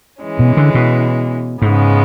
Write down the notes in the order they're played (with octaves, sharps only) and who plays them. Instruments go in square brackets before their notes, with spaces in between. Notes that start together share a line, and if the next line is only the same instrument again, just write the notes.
[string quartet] E3 G#3 C#4
[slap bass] B2
D3
B2
[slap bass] G#2 [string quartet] C#3 G#3 B3